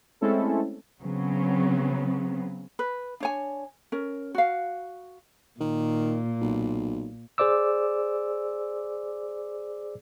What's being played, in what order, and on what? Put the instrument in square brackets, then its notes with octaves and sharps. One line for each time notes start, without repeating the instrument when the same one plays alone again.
[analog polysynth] G#3 A3 C4 C#4 E4 A4
[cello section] C#3 F#3 B3 C4
[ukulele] B4
D4 C#5 G#5
C#4 A#4
F#4 F5
[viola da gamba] A#2 [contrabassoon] D#3
[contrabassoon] B1
[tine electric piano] G#4 C5 D5 D6 E6